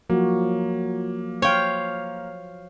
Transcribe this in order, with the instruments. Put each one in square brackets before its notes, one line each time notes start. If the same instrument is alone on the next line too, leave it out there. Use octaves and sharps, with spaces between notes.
[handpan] F3 F#3 F#4 [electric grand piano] A#3
[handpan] C5 F5 [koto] C#5 G5